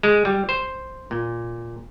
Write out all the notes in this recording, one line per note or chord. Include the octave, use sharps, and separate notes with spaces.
G#3
G3
C5
A#2